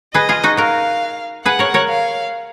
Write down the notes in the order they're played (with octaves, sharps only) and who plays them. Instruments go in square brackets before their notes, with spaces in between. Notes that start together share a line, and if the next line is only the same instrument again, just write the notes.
[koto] G#4 B4 [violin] D#5
[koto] F4 G#4
D#4 F#4
[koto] F#4 A#4 [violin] F5
[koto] G#4 B4 [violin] F#5
[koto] A#4 C#5
A#4 C#5
[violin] F5